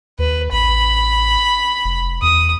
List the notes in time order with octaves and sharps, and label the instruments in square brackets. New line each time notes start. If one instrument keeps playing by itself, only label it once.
[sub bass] D#2 [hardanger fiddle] B4
[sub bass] A1 [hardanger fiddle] B5
[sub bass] F1
[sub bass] E2 [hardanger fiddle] D#6